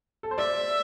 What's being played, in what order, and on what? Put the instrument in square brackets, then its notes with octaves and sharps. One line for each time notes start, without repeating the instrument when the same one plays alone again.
[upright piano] A4
C5
[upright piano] D5 [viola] E5